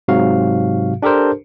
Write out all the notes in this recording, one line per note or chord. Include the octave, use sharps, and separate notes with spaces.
G#2 C3 F#3 F#4 F5
D4 G4 A4 A#4 C5